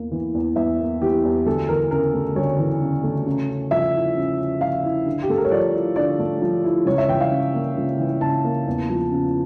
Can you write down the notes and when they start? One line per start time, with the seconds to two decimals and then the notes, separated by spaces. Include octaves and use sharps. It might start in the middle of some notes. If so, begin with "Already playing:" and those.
Already playing: E2 A#3
0.11 E3
0.34 E2
0.56 E2 E5
0.79 A#3
1.01 E3 G4
1.24 E2
1.46 D2 A4
1.68 E3 A#4
1.91 C#3 A#4
2.14 A3
2.36 D2 C#5
2.59 E3
2.82 C#3
3.04 A3
3.26 C#3
3.49 C#4
3.71 F3 E5
3.94 E4
4.17 C#3
4.39 C#4
4.61 F3 F5
4.84 E4
5.06 D3
5.23 G4
5.29 A3 A4
5.38 A#4
5.45 C#5
5.51 F3 D5
5.74 E4
5.96 D3 D5
6.19 A3
6.42 F3
6.64 E4
6.86 C#2 C#5
6.98 E5
7.09 E3 G5
7.20 F5
7.32 C#3
7.54 A#3
7.77 C#2
7.99 E3
8.21 C#3 A5
8.45 A#3
8.67 E2
8.89 F3
9.12 C#3